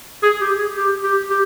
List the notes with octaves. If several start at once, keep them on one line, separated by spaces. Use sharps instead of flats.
G#4
G4
G#4
G4
G4
G4